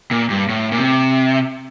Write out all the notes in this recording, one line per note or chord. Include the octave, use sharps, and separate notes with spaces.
A#2
G2
A2
A#2
C3